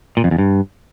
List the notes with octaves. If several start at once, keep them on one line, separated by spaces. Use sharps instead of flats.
A#2
F2
E2
G2